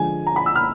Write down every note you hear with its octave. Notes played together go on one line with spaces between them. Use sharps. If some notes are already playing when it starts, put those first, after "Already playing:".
Already playing: D3 F3 G#3 G#5
A#5
B5
E6
F6